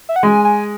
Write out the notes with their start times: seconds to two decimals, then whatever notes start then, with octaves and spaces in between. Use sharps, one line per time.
0.09 E5
0.16 F#5
0.23 G#3 G#5
0.44 G#5